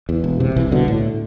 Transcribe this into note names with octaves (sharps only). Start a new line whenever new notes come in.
E2
E1
C3
C2 E3
B2 D3
A2